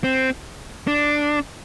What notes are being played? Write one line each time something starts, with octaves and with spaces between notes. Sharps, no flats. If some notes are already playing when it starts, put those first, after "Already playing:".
C4
D4